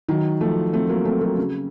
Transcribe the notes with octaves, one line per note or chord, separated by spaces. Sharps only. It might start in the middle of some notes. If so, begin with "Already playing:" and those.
D#3 F#3
F3 A3
A3 C4
F#3 A#3
A3 C4
F#3 A#3
C#3